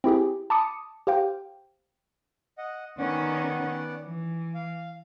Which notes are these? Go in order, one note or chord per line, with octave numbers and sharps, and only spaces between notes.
C4 E4 G4 G#4
A5 B5 D6 D#6 C#7
G4 C5 F5 G5
D#5 F#5
D#3 B3 C#4 D5 F#5
E3
F5